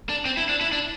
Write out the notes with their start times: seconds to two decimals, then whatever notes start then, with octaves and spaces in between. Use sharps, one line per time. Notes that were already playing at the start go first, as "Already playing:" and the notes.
0.09 D4
0.25 C4
0.37 E4
0.49 D4
0.61 E4
0.73 D4